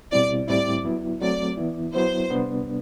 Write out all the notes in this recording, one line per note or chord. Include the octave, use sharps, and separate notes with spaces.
B2 G3 C4 E4 D5
A2 G3 C4 E4 D5
F#3 B3 E4
F#3 A3 C4 D5
E3 B3 E4
F#3 B3 E4 C5
C3 G3 B3 D4